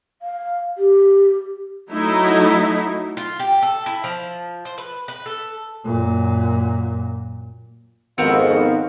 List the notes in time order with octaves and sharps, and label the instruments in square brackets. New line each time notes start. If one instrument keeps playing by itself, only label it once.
[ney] F5
G4
[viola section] F#3 A3 D#4 E4
[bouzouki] F4
G4
A4
E4
F3
C5
B4
B4
A4
[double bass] F#2 A#2
[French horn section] F2 G#2 [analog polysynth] D#3 B3 [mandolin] C4 F#4 A#4 [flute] F5